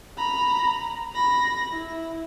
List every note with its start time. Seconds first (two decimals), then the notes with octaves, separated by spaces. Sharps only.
0.17 A#5 B5
1.15 B5 A#6
1.71 E4